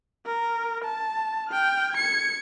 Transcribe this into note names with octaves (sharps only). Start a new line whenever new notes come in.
A#4
A5
G5 F6
G#6 C#7